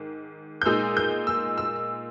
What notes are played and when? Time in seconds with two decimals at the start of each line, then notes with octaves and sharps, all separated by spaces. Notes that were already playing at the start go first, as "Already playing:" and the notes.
Already playing: G#2 D#3
0.62 G6
0.66 A#2 G#3 D#4 E6
0.97 G6
1.27 E6
1.58 E6